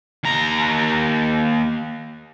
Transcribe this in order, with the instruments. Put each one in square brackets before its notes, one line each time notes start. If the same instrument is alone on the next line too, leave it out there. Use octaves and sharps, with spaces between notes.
[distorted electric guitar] D#2 A#5